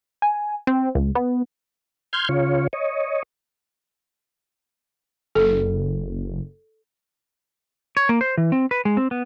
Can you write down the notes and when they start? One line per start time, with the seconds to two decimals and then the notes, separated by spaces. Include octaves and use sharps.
0.22 G#5
0.67 C4
0.95 C#2
1.15 B3
2.13 C6 F6 G6 G#6
2.29 C#3 F4 C#5
2.73 C#5 D#5
5.35 F#1 A4
7.97 C#5
8.09 A#3
8.21 C5
8.38 E3
8.52 C4
8.71 B4
8.85 G#3
8.97 C4
9.11 B3